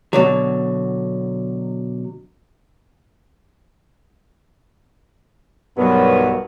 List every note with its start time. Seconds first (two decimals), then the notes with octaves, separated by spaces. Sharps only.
0.13 B2 D3 F#3
5.77 B1 G2 F#3 B3 A#4 B4